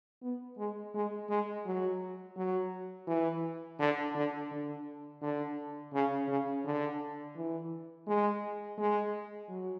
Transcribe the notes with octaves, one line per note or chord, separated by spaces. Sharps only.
B3
G#3
G#3
G#3
F#3
F#3
E3
D3
D3
D3
D3
C#3
C#3
D3
E3
G#3
G#3
F#3